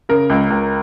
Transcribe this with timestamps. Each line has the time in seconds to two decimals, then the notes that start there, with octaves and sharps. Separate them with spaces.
0.09 C#3 A#4
0.30 C#2
0.50 C#2